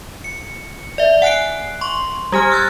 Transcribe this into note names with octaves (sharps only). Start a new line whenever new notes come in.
C#7
D5 E5
F#5 G#5 F#6 C7 D7
C6 C#6
G3 G4 G#5 F6
E6 F#6 G#6 A6